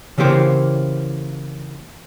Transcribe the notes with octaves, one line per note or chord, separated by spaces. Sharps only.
C#3 E3 A#3 G4 C5 C#5